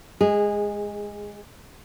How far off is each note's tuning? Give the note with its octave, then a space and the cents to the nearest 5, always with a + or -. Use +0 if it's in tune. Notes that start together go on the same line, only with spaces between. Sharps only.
G#3 +0 G#4 -20